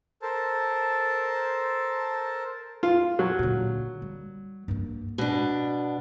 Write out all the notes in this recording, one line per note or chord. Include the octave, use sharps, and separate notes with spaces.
A4 A#4 C5 A5
F4
F#3
A#2 D3
G3
G2 A#3
B2 D4